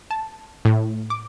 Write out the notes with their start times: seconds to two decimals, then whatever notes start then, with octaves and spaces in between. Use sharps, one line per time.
0.11 A5
0.65 A2
1.10 D6